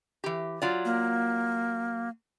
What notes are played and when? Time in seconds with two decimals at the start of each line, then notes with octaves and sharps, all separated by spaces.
0.24 E3 G4
0.62 F#3 F4 D5
0.85 A#3